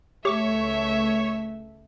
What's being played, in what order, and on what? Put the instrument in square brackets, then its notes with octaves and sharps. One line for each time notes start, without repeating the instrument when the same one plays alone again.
[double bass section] C#2 A3 [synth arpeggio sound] G4 C#6 [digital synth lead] C#5 [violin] E5